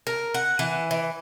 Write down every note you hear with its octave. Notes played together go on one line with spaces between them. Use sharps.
A#4
F#5
E3
E3